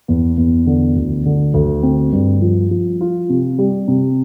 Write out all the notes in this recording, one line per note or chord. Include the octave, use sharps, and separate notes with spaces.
E2
E2
D3
D2
D3
D2
C4
G2
F3
F3
F4
C3
G3
C3